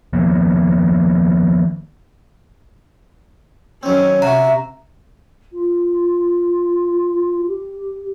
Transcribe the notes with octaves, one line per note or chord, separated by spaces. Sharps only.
D#3 F3 A#3 B3
D#3 F#3 C4 C#4
C3 F#4 E5 F#5 A#5
F4
G4